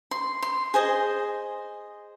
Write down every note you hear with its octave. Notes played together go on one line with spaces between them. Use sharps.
C6
C6
G#4 C5 D#5